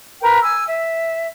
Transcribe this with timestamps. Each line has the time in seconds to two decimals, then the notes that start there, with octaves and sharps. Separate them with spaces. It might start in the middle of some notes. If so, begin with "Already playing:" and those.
0.21 A#4 B4 G5
0.43 G#5 E6
0.67 E5